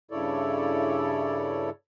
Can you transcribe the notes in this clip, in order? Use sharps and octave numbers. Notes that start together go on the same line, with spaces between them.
G2 C#3 E4 A4 C#5 D5